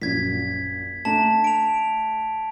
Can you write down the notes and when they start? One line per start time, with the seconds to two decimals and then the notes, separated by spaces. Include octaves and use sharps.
0.02 A#1 F#2 G#6 B6
1.05 A3 D4 A5 A#5
1.44 D7 F7